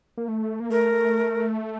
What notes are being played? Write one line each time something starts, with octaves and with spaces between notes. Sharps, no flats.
A#3
A3
A#3
A3 A#4